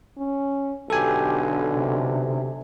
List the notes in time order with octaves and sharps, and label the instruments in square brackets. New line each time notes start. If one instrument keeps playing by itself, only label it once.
[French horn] C#4
[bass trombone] B1 [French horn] D3 [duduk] G4 [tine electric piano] A4 G#5
[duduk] C3